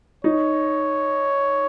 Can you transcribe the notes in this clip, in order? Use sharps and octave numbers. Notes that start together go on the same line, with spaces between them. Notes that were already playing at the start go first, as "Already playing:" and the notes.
D#4 C#5